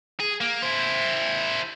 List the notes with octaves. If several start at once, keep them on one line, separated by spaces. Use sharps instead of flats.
G#4
A#3
E4 C5